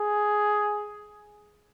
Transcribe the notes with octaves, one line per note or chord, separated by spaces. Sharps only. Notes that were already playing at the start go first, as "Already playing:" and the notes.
Already playing: G#4